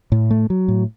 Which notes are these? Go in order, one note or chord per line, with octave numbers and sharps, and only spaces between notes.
A2
A3
F#3
A2